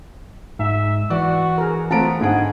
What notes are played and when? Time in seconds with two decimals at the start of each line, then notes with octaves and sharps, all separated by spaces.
0.59 G#2 E5
1.10 E3 F#4 D5
1.58 G#4 A#4
1.91 A3 B3 C4 F4 A5 A#5 D7
2.21 G#2 D3 G#4 F#5